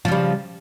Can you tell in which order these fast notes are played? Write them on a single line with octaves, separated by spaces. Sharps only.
F3 C#3 G3